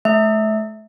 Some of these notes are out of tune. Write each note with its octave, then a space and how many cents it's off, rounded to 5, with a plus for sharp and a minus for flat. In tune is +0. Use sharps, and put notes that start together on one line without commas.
A3 -35 E5 -20